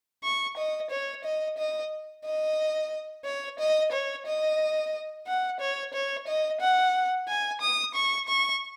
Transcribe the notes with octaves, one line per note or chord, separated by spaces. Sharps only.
C#6
D#5
C#5
D#5
D#5
D#5
C#5
D#5
C#5
D#5
F#5
C#5
C#5
D#5
F#5
G#5
D#6
C#6
C#6